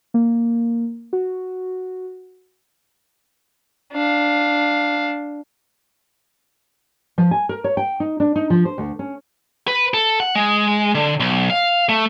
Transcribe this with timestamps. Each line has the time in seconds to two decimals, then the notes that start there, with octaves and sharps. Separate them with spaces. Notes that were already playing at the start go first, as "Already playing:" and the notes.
0.14 A#3
1.13 F#4
3.93 D4 F5
7.18 F3
7.31 G#5
7.49 A#4
7.64 C#5
7.77 G5
8.00 D#4
8.20 D4
8.36 D#4
8.50 F3
8.65 C5
8.78 D2
8.99 C#4
9.67 B4
9.94 A4
10.20 F#5
10.35 G#3
10.95 D3
11.20 B1
11.50 F5
11.89 A3